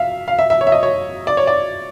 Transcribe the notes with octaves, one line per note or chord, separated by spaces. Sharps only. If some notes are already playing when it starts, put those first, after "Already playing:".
Already playing: E5 F5
F5
E5
E5
C#5
E5
D#5
C#5
D5
C#5
D5